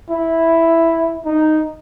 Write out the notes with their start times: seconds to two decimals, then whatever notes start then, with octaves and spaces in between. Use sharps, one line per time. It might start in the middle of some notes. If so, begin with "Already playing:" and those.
0.10 E4
1.26 D#4